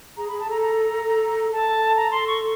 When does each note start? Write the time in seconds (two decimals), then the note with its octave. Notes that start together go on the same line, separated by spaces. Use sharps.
0.17 G#4 A#5
0.28 G#4 B5
0.40 A5
0.47 A4 A#5
0.62 A#5
1.07 A4
1.52 A4 A5
1.96 A#5
2.11 C6
2.27 C#6